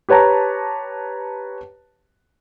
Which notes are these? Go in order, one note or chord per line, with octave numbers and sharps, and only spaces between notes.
G4 B4 C#5 A5 A#5